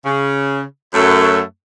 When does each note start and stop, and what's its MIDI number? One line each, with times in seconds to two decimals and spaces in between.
0.05 0.61 49
0.94 1.40 42
0.94 1.40 57